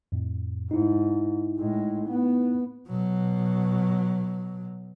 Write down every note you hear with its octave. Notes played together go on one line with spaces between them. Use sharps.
F2 A2
G#2 D#4 E4
A2 G#3
B3
B2 F#3